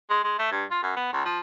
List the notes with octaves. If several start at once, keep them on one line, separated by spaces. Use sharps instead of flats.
G#3
G#3
A3
G2
F4
F#2
B3
C#2
F3